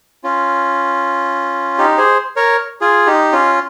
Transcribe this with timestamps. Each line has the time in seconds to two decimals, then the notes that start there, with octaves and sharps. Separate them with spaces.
0.24 C#4 F4
1.78 D#4 G4
1.97 G#4 C5
2.36 A#4 C#5
2.81 F4 G#4
3.06 D#4 G4
3.32 C#4 F4